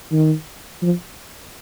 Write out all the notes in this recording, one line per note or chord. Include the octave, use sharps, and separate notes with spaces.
D#3
F3